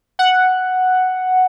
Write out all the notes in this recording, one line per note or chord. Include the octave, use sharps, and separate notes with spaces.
F#5